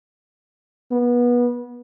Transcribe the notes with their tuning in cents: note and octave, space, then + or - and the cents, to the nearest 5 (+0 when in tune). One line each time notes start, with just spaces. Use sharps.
B3 -25